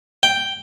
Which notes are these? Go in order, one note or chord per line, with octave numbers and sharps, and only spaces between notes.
G5